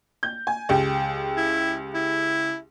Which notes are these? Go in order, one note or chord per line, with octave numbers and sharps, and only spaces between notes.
G6
G#5
C#2 G4
E4
E4